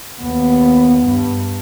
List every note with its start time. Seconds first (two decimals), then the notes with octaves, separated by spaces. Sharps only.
0.21 D#2 B3
1.04 G2